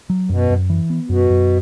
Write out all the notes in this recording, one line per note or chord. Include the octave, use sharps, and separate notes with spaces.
F#3
F#2 B2
F#2
E3
B3
F#2 B2
F#2